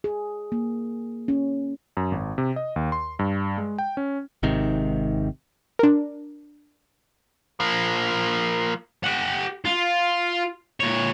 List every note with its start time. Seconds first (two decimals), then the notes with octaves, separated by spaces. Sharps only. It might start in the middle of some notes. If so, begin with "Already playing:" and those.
0.04 G#4
0.52 A#3
1.28 C#4
1.97 F#2
2.11 G#1
2.38 C3
2.56 D#5
2.76 D#2
2.92 C6
3.19 G2
3.58 G#3
3.78 G5
3.97 C#4
4.43 G#1 G#2 C3 D#3
5.79 D4 A#4
7.60 F3 A#3
9.04 G4 F#5
9.65 F4
10.80 A#2 C#5